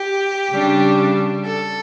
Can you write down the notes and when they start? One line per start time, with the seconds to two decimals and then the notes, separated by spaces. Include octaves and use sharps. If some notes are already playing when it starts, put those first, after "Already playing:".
Already playing: G4
0.52 C#3 G3 D4
1.46 A4